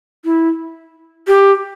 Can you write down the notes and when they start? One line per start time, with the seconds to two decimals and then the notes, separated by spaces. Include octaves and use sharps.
0.25 E4
1.27 G4